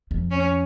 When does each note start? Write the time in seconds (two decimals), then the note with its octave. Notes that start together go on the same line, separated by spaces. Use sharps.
0.11 F2
0.31 C#4